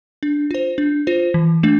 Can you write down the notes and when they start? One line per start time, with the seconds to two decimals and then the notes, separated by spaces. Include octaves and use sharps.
0.23 D4
0.51 F4 C5
0.78 D4
1.07 F4 C5
1.34 E3
1.63 A3 D4